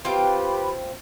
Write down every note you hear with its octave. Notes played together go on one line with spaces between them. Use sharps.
C4 F4 G4 B4 G5 B5